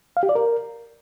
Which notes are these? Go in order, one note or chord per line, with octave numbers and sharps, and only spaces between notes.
F5
G4
D5
A#4